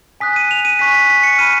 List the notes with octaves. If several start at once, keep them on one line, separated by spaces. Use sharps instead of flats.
G#5 D#6 F#6 B6
D#7
F7
D#7
G#5 C#6 F#6 B6
B6
B6
C#7
B5 F6 D#7